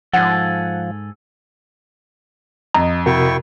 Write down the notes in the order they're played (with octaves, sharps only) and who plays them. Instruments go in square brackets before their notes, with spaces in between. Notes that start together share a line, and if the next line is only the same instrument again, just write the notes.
[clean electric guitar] G#2 G#4 A4 [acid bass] F3 [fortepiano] F#5
[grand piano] F2 [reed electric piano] D#5 [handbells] A#5
[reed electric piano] C3 F#4 A#4 [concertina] E4 G5 C#6